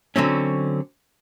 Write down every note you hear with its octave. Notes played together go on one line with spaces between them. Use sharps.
D3 F#3 C4 C#4